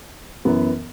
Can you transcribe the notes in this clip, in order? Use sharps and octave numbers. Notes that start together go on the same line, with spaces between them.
F#2 E3 B3